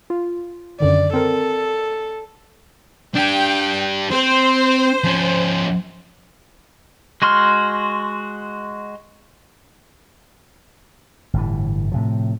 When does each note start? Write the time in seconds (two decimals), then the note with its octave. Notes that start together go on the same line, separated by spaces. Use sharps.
0.10 F4
0.80 F#2 D3 D#3 D5
1.13 C4 A4 A#4
3.16 D4 G4 G5
4.12 C4 C5
5.04 F3 C#4
7.22 G#3 F#4 C6 F6
11.34 G1 A2 E3
11.92 A2 C3 F3